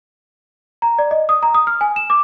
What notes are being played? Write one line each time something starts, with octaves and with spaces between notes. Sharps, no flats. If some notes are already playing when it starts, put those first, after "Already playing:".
A#5
D5
D#5
D#6
A#5
D#6
F6
G#5
E7
D6